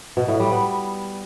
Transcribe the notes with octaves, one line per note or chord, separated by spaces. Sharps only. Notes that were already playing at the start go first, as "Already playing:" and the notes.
B2
A2
G3
B3